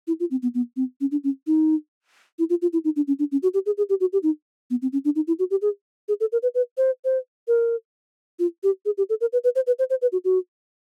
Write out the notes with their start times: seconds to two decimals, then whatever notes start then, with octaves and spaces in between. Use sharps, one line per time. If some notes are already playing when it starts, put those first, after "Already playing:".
0.07 E4
0.20 F4
0.31 C4
0.43 B3
0.54 B3
0.76 C4
1.01 C#4
1.11 D4
1.24 C#4
1.47 D#4
2.39 E4
2.50 F4
2.62 F4
2.73 E4
2.84 D#4
2.96 D4
3.08 C#4
3.19 D4
3.32 C#4
3.43 F#4
3.54 G4
3.66 G#4
3.77 G#4
3.89 G4
4.00 F#4
4.13 G4
4.23 D#4
4.71 B3
4.82 C4
4.93 C#4
5.05 D4
5.16 D#4
5.27 E4
5.39 F#4
5.51 G4
5.62 G#4
6.08 G#4
6.20 A4
6.32 A#4
6.43 B4
6.55 B4
6.78 C5
7.05 C5
7.48 A#4
8.39 F4
8.63 G4
8.86 G#4
8.98 G4
9.09 A4
9.21 A#4
9.33 B4
9.44 B4
9.56 C5
9.67 B4
9.79 C5
9.90 C5
10.02 B4
10.12 F#4
10.25 F#4